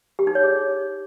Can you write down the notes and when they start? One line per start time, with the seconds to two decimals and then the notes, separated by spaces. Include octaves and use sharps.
0.19 G4
0.27 D#4
0.35 C#5
0.43 G#4